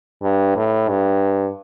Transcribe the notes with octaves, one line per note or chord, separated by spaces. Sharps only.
G2
A2
G2